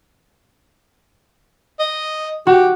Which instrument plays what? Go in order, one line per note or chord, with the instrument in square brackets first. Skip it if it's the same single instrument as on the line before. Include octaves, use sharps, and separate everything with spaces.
[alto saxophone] D#5
[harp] F#4 [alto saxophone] G4